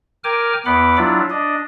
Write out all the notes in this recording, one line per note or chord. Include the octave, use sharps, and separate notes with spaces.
A#4 G5 G#5 D6 F6
E2 B3 F#5 B5 D6
F#3 D4 E4 F4
D4 D#5